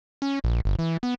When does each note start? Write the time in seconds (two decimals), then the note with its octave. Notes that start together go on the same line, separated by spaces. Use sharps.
0.22 C#4
0.44 A#1
0.65 G1
0.79 E3
1.03 B3